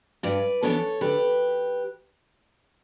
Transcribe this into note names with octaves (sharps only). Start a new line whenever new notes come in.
G2 B4 D5
E3 B3 D4 A4 C#5
D3 G4 B4